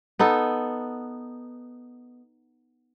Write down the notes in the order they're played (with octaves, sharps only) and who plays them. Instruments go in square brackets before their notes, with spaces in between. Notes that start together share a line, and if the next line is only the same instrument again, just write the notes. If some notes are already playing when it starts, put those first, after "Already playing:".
[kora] B3 D#4 A4